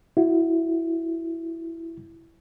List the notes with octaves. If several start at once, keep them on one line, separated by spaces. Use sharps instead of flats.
E4 F#4